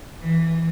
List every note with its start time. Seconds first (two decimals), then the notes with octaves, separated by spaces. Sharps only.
0.21 E3